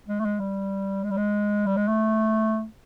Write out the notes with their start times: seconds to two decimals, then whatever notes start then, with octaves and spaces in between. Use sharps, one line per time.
0.08 G#3
0.20 A3
0.25 G#3
0.40 G3
1.04 G#3
1.11 G3
1.17 G#3
1.66 G3
1.77 G#3
1.88 A3